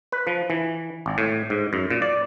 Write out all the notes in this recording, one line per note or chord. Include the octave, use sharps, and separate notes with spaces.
B4
F3
E3
G#1
A2
G#2
F#2
A#2
D5